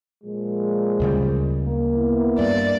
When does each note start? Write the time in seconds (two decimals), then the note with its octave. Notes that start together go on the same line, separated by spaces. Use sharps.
0.24 A#2 F3 G#3
1.00 D2 C#3 G3
1.64 A#3
1.97 B3 E4
2.39 G2 D5